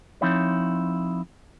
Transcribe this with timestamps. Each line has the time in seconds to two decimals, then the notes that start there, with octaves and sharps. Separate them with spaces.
0.21 F3 C4 D#4 E4 C#5